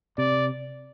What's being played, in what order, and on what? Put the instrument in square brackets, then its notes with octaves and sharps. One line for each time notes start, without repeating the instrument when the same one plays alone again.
[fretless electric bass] C3 [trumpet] D5